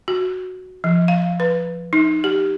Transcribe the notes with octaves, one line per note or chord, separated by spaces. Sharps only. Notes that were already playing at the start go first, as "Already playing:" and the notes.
F#4
F3
F5
B4
D#4
G4